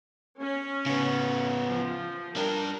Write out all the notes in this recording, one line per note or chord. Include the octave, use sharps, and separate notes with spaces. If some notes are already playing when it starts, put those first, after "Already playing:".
C#4
C#3 B3
F3
G3 D4 A#4